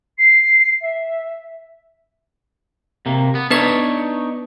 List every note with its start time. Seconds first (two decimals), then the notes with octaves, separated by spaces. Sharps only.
0.18 C7
0.81 E5
3.06 C3 A#3
3.35 B3
3.51 B3 D4 D#4 B4 C#5 B6